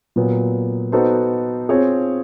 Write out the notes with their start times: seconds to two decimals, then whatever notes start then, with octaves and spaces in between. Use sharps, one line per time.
0.16 A#2 F#3 B3
0.92 B3 D#4 F#4 A4 C5
1.69 C4 F4 G#4 C#5